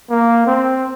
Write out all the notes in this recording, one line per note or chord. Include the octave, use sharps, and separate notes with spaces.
A#3
C4